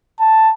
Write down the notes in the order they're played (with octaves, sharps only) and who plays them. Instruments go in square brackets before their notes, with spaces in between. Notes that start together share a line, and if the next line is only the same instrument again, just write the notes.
[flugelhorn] A5